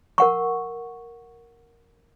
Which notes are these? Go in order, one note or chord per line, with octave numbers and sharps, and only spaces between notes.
A#4 F#5 C#6